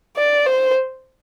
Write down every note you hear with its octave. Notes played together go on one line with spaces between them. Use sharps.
D5
C5